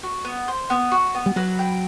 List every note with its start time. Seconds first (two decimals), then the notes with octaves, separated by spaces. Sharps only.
0.03 F#4
0.25 B3
0.48 C5
0.70 B3
0.92 F#4
1.15 B3
1.26 G3
1.36 F#3 B4
1.59 G5